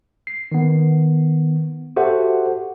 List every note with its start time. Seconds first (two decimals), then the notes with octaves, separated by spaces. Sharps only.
0.27 C7
0.52 D#3 B3
1.96 F#4 G4 A4 C5 E5 F#5